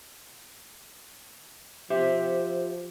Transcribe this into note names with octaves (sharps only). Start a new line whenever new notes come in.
F3 G4 C5 E5